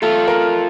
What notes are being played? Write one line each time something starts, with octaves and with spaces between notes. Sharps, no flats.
A3 F4 A4
A#4